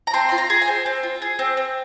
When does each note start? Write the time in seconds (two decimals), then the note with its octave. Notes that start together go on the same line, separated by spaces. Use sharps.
0.07 A#5
0.13 C4 C6
0.29 F4 C6
0.38 A#5
0.50 G#4
0.62 G#5
0.67 C4
0.86 C4
1.03 F4
1.22 G#4
1.39 C4
1.57 C4